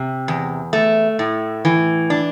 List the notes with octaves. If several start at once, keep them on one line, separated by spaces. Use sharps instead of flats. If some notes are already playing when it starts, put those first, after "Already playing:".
Already playing: C3
E2
A3
A2
E3
D4